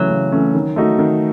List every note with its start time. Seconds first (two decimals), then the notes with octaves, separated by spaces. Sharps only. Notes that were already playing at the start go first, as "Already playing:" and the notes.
Already playing: C#3 E3 F#3 A3 C#4
0.10 C#3
0.32 E3 A3 C#4
0.55 D#3
0.76 A3 D#4 F#4
0.99 D#3